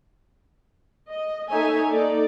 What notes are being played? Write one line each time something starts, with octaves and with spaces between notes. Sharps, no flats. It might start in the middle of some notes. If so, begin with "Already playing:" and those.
D#5
A#3 D#4 A4 C#5 E5 G#5
A#3 D#4 A4 D5